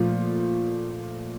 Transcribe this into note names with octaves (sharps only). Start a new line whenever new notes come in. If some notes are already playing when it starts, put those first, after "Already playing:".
Already playing: A#2 F3 A3 F4